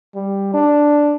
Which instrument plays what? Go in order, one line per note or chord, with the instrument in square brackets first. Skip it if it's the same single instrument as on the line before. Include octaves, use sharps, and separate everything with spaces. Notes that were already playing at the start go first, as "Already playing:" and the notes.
[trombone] G3
D4